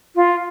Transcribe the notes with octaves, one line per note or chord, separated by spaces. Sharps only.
F4